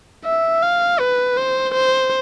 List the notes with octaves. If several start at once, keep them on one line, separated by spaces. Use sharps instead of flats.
E5
F5
B4
C5
C5